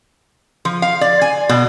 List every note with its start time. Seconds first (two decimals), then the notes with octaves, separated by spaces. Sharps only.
0.65 F3
0.82 F5
1.01 D5
1.22 G#5
1.49 B2